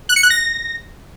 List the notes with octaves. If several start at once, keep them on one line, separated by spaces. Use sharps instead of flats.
F#6
C#7
F#6
A#6